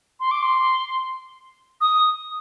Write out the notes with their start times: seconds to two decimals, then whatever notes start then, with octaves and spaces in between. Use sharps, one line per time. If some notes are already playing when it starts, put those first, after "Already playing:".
0.20 C6
0.31 D6
0.43 C6
1.81 D#6